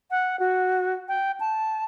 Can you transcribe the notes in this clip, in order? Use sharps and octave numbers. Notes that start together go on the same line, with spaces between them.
F#5
F#4
G5
A5